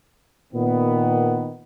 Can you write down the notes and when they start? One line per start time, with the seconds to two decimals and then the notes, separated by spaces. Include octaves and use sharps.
0.53 A#2 D#3 B3